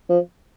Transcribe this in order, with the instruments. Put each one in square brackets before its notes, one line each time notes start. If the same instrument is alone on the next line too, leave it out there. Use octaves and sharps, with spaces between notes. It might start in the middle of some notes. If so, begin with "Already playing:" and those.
[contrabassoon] F3